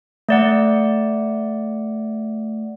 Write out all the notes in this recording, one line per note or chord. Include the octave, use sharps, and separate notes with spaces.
A3 D5 F#5